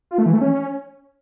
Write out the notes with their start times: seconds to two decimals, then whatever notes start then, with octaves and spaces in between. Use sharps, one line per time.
0.11 F4
0.18 A3
0.26 E3
0.34 A3
0.41 C#4